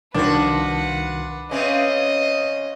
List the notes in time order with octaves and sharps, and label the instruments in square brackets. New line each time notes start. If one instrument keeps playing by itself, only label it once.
[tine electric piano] C2 D#3 [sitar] F3 F#4 [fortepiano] D4 [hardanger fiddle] B4 F#5
[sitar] C#3 C4 C#4 [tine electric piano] B4 E5 [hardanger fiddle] D#5